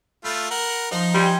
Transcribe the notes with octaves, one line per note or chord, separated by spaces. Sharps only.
A3 F4 B5
A#4 F#5
F3 D#4 A#5 C6
G3 C5 G5 G#5